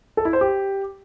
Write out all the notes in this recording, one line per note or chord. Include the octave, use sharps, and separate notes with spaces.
A4
E4
C5
G4